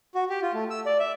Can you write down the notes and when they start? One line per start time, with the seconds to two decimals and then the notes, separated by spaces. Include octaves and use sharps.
0.15 F#4
0.29 G4
0.42 F4
0.54 A3
0.70 E6
0.86 D5
0.99 E5